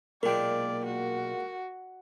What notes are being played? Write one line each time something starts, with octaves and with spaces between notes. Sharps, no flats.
B1 A#2 G#3 A#3 A#4 D5 G5
F#4